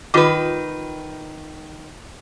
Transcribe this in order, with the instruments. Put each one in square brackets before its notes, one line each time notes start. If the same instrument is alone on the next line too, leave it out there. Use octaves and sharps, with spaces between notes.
[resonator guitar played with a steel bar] D#3 B4 [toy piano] F4 D#5 D6